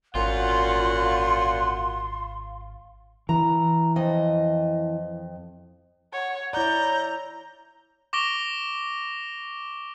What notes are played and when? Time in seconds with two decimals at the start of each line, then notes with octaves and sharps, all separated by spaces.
0.15 G#1 F#2 A#2 F4 F#5 C6
3.29 E3 A#5
3.96 F2 D#5
6.13 C#5 F#5
6.53 E4 C#5 D5 A#5 G6
8.13 C#6 D6 A#6 D7 G7